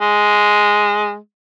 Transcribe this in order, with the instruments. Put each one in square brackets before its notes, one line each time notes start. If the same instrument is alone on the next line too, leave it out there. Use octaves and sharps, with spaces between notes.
[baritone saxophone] G#3